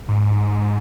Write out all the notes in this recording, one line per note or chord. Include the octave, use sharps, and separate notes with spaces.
G#2